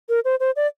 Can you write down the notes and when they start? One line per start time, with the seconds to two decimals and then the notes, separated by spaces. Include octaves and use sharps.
0.09 A#4
0.25 C5
0.40 C5
0.56 D5